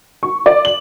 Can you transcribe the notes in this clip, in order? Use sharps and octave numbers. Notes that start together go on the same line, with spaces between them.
C#6
D5
F#7